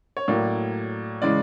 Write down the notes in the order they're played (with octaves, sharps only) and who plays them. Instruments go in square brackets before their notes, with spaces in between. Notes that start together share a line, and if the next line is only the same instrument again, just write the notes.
[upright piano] C#5
A2 F#3 A#3 D5
C#3 E3 G#3 D5